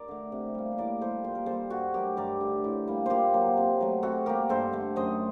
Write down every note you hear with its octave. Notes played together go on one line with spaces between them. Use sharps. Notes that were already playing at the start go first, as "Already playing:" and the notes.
Already playing: A#4 D5
D3 A3
C3
G3 A#3
C5
A2 A#4 D5
G3 A#3 A4 C5
A#2 C5
A#4
G3 A#3 A4 C5
G2 F#4 A4
F#3 A3 G4 A#4
G2 A#4 D5
D3 A3
A2
G3 A#3
A#2 G4 A#4 C5
F#3 A#3
C3
F#3 A3
C3 F#4 A4
G3 A#3 G4 A#4
G2 A4 C5
D3 A3
F#2 C5 D#5